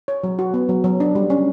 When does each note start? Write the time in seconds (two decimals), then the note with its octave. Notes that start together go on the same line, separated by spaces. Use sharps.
0.08 C#5
0.24 F#3
0.39 F#4
0.54 B3
0.69 F#3
0.84 F#3
1.00 D4
1.15 G3
1.30 C#4